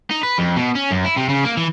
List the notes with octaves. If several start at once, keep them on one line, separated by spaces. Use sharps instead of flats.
D#4
B4
F2
B2
C#4
F#2
E4
C3
C#3
A#3
E3